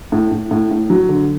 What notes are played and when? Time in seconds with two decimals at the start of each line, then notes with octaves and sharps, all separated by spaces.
0.12 A2
0.31 A2
0.51 A2
0.71 A2
0.90 F#3
1.09 D3